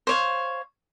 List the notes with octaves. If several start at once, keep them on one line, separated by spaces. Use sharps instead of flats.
C5 C#5 F5